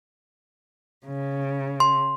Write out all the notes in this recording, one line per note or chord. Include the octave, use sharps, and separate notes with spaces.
C#3
C6